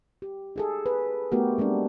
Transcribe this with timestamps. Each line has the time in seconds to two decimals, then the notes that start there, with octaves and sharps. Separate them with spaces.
0.22 G4
0.56 D#4 G#4 A4
0.86 B4
1.32 A3 B3 D#4 F#4 G4 A#4
1.58 G3 G#3 C4 D4